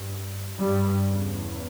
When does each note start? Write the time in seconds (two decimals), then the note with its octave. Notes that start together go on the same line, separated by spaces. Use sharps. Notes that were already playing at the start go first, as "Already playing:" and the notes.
Already playing: G2
0.57 G2 G3
1.07 E2 C#3